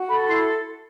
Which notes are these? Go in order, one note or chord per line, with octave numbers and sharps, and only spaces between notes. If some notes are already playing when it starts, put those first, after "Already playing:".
Already playing: F#4
A4 B5
E4 C6